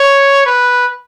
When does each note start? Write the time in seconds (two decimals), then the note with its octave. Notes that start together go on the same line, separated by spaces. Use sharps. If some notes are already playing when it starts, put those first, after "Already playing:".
Already playing: C#5
0.46 B4